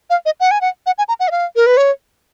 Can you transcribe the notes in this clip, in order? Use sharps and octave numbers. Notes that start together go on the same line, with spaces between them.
F5
D#5
F#5
G#5
F#5
F#5
G#5
A#5
F#5
D#5
F5
A#4
B4
C#5